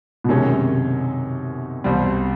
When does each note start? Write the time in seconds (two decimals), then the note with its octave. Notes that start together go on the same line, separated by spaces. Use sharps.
0.24 B2
0.29 F#2 C3 D#3 G#3 C#4
1.84 C2 B2 G3 C4